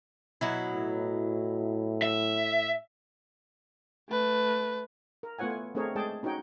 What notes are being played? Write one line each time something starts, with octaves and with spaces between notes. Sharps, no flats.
B2 F#3 E4
A2
E5
A3 B4
A#4
A3 B3 F4 C#5 F#5 G#5
G#5
A3 C4 D4 G#4 A#4 C#5
G#3 A3 G#4 D5 G5 A5
C#4 D#4 F#4 C#5 G5